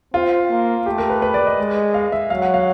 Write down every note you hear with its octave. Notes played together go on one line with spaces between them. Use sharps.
C4 F4
A#3
A3 G4
A#4
B4
B4
D5
D#5
G#3
F5
E5
F#3 F5
F#5
F5